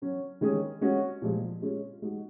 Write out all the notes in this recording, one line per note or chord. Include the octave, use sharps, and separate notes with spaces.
F#3 C#4 F#4
D#3 G#3 C#4 G#4
G#3 C#4 F#4
A#2 F3 G#3
G#3 C#4 F4 G#4
G#3 D#4 F#4